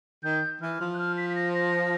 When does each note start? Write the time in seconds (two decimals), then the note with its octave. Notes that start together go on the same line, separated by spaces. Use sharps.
0.23 D#3 G6
0.61 E3 F6
0.80 F3
0.94 F#6
0.99 F6
1.17 B6
1.30 B6
1.35 A#6
1.55 A#6